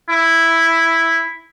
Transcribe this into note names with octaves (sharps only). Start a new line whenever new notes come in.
E4